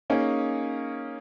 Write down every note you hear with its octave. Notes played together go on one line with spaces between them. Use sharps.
A#3 C#4 D#4 G#4